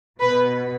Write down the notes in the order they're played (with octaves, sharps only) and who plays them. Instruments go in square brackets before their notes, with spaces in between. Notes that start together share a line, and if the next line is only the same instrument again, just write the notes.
[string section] B2 B4